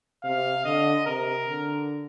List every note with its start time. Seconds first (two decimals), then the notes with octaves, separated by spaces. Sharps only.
0.23 C3 F5
0.65 D3 D#5
1.06 C3 A#4
1.48 D3